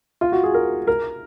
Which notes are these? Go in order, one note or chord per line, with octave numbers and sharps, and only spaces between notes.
F4
F#4
G#4
A#4
A#4